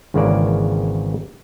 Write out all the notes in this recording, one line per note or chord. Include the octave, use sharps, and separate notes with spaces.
G#1 C#3 E3 A#3 C#4 D5